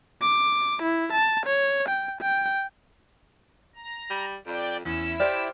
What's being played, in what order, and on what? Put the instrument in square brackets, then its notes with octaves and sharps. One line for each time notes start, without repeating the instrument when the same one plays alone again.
[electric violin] D6
E4
A5
C#5
G5
G5
[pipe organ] A#5
[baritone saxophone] G3
[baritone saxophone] F2 [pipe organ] D5 G5
[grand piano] E2 [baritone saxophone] C#4 [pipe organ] E4 E6
[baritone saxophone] G4 [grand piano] C5 F6 [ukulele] D5